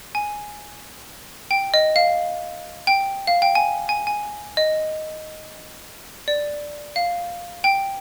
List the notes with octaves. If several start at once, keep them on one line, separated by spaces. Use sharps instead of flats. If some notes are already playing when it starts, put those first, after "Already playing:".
G#5
G5
D#5
F5
G5
F5
G5
G#5
G#5
G#5
D#5
D5
F5
G5